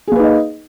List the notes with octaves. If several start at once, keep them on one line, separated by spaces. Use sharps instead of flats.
A#3 D#4 G#4 B4 D#5